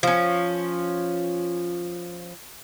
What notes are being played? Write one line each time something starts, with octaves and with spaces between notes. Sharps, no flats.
F3 C#4